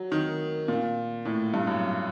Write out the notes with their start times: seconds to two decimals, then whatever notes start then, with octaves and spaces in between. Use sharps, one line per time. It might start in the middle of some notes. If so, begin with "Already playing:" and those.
Already playing: F#3
0.12 D#3
0.68 A#2
1.25 A2
1.54 G2
1.67 F#2